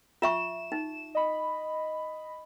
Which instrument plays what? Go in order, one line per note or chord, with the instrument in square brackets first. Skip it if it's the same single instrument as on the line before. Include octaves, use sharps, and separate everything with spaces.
[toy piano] F4 E5 C#6 [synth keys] E7
[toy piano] D#4
[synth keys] D#5 B5